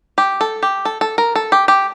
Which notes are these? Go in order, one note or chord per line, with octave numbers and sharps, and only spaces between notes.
G4
A4
G4
A4
A4
A#4
A4
G4
G4